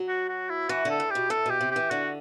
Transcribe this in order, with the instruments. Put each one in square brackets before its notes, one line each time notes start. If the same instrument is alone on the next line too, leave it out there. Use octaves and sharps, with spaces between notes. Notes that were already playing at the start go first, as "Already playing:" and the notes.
Already playing: [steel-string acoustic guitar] F#3
[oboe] F#4
F#4
E4
[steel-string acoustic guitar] E3 [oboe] F#4
[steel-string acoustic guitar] D3
[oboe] A4
[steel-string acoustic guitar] A2
[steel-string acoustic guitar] B2 [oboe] G4
[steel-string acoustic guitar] A2 [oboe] A4
[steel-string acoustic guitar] B2 [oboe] G4
[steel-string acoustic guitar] C3
[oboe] G4
[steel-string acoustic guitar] E3
[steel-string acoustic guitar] D3 [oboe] F#4